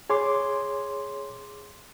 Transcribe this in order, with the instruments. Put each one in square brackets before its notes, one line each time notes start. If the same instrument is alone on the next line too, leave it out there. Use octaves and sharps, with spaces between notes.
[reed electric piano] G#4 C#5 C6 D6